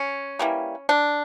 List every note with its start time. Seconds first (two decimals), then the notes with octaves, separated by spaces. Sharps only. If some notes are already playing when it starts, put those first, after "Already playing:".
Already playing: C#4
0.39 E3 G3 A#3
0.89 D4